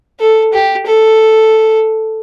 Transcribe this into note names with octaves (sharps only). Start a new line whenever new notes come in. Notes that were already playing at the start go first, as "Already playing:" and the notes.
A4
G4
A4